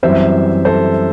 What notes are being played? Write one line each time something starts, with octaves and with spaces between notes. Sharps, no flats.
F#2 E3 G3 C4 C5 E5
A4 C5